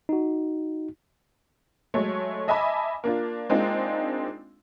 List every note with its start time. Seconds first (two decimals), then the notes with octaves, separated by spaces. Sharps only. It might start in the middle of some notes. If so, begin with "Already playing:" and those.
0.09 D#4 F#4
1.94 F#3 G#3 A3 C#5
2.48 D#5 E5 G#5 A5 B5 D6
3.04 A#3 D4 F4
3.50 G#3 A#3 C4 D4 D#4 F4